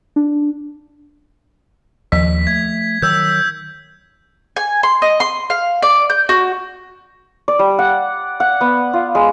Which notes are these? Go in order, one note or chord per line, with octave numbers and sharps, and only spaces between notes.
D4
D#2 F3 B6
A3 G#6
D#3 F#3 E6 G6
G#5
C6
D#5
C6
F5
D5
G6
F#4
D5
G3
F#5
F#5
B3
F4
G#3